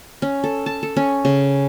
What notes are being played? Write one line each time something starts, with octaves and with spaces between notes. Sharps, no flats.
C#4
A4
A5
A4
C#4
C#3